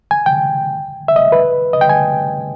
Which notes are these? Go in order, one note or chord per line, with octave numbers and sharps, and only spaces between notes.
G#5
G5
E5
D#5
B4
D#5
G5
G#5